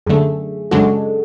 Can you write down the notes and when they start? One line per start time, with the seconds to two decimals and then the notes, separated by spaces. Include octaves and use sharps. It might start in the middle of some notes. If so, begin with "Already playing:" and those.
0.06 F#2 D3 A3 G#4
0.71 F#2 C#3 G#3 D4 F#4 A4